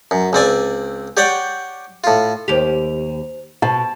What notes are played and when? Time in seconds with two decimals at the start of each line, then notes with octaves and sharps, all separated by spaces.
0.11 F#2
0.33 C#2 C4 D5 G#5
1.17 G4 C#5 D5 F#5 G5
2.04 A2 F4
2.48 D#2 G4 C5 F7
3.62 B2 A5